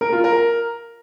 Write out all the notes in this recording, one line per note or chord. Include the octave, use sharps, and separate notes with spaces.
A#4
F4
A#4